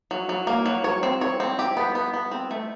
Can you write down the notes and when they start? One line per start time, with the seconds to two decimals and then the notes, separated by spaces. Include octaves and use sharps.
0.11 F#3
0.29 F#3
0.47 A#3
0.66 F#3
0.84 C#5
1.03 C4
1.21 C#5
1.40 C4
1.59 G4
1.77 B3
1.95 B3
2.14 B3
2.31 C4
2.51 A3